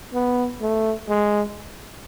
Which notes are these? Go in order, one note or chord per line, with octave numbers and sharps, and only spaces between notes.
B3
A3
G#3